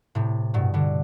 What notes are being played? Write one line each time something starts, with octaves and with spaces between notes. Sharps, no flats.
A2 C3
G2 B2
B2 D3